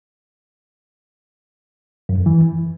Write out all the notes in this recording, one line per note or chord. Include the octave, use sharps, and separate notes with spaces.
F#2
F2
E3